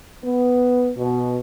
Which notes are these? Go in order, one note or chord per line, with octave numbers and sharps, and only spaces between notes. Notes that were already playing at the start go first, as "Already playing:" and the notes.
B3
B2